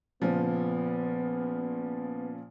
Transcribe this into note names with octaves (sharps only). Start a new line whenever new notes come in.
A#2 C#3 F3 B3